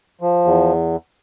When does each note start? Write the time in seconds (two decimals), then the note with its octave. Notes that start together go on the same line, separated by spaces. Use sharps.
0.21 F3
0.45 E2